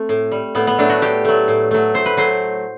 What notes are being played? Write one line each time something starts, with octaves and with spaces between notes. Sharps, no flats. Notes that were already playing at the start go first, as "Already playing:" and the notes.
Already playing: A3 C4
A2
G3
A2 B3
B3
F#3 A3 D4
F#4
A2 G4
F#3 A3
A2
F#3 A3
A2 C5
B4
F#3 A3 C5